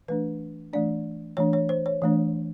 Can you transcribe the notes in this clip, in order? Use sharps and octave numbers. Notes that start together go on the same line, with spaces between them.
E3 A3 D4 B4
E3 A3 D4 D5
E3 A3 D4 C#5
C#5
C5
C#5
E3 A3 D4